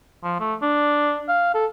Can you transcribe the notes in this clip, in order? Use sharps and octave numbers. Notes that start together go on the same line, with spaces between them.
F3
A3
D4
F5
A4